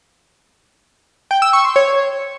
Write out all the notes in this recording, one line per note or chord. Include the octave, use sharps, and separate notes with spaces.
G5
E6
C#6
C6
C#5